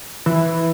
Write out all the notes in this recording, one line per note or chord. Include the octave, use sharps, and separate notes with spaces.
E3